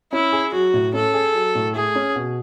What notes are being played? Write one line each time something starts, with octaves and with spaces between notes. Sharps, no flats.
C#4 E4
G#4
F#3 F#4
A2
C#4 A4
G#4
F#3
A2
A3 G#4
C#4
B2